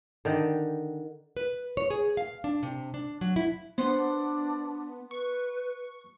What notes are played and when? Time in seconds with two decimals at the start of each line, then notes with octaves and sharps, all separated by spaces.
0.25 D3 D#3 G5
1.37 B4
1.77 C#5
1.90 G#4
2.17 F5
2.44 D4
2.63 C3
2.94 D4
3.21 F#3
3.36 E4
3.78 B3 D4 C5 F#5 C6
5.11 B4 C#6